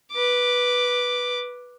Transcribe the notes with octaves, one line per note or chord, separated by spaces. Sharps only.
B4 D6